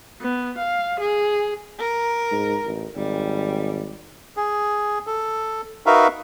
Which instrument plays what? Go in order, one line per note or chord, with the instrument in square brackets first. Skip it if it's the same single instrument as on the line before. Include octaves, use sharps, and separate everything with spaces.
[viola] B3
F5
G#4
[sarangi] A#4
[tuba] G#2
A1
[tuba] G#1 [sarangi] G3
[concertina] G#4
A4
D#4 F#4 A#4 B4 E5 F5